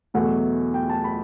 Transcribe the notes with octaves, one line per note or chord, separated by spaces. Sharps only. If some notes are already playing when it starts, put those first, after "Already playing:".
E2 B2 F#3 A3 F#5
G5
A5
B5